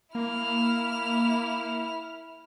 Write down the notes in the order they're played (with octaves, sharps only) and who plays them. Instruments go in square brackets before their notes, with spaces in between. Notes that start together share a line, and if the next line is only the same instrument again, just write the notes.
[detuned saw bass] A#3 [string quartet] E4 F6